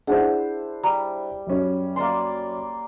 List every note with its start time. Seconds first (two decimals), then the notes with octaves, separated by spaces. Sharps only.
0.07 D4 E4 G#4 C5 F#5
0.84 G3 A#5
1.47 F#2 C#4
1.96 A#3 D5 C6